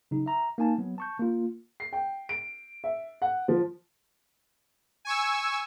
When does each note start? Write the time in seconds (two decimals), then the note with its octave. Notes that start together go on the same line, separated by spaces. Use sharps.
0.11 C#3 F#3 D#4
0.26 E5 A#5
0.58 A#3 D#4 G#5 A5
0.78 F#3 B3
0.98 A5 C#6 G6
1.20 A#3 F4
1.80 C7
1.93 G5
2.29 D7
2.84 E5
3.22 F#5
3.48 F3
5.05 G#5 C#6 E6